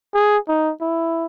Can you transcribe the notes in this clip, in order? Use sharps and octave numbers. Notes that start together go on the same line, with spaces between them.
G#4
D#4
E4